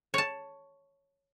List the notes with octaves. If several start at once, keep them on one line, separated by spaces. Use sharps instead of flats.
C#5 A5